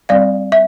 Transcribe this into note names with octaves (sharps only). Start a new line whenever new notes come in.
G3 C4 D5 F5
E5